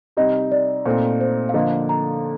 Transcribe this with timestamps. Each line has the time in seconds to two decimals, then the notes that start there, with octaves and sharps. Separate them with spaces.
0.17 C3 G3 C4 D#4 D#5
0.52 D5
0.85 A#2 A3 C4 D#4 C5
1.21 C5
1.49 F5
1.54 D3 F3 A#3 D#5
1.89 A#5